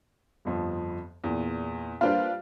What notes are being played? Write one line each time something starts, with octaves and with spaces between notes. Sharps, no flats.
G1 F2 F3
E2 A#2
G3 A#3 D4 F4 B4 C5